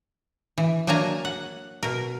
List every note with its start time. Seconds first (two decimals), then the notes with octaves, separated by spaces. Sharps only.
0.58 E3
0.87 F#3 A#3 D4 G#5 A#5
1.25 F#5
1.83 B2 A#4